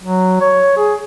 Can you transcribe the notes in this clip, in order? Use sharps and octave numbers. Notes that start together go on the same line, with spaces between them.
F#3
C#5
G#4